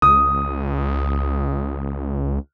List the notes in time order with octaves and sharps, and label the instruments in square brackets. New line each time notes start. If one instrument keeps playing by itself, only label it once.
[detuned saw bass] C#2 [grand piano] D#6